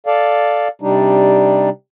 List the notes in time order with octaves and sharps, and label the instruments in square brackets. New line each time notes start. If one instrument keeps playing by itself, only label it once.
[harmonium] A4 D5 F5
C3 G3 D4 D#4